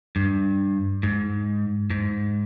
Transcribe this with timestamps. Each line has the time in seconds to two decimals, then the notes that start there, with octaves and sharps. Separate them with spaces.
0.16 G2
1.03 G#2
1.90 G#2